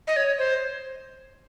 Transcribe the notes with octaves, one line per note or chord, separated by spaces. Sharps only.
D#5
C#5
C5